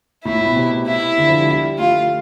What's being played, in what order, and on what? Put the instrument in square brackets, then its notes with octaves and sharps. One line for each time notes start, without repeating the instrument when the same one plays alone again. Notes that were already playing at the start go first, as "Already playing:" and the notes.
[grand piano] A2 [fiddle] E4
[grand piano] A2
B2
C3
[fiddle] E4
[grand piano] D3
F3
G3
G3
[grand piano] A3 [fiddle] F4